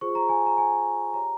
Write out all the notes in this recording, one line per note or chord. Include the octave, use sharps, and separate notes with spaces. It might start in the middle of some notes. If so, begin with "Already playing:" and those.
F4 G#4 C5 C#6
A#5
G#5
A#5
G#5
G4 C#5 A#5